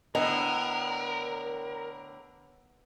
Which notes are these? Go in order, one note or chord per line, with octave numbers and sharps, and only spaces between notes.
A2 D3 B3 A#4 D#5 G#5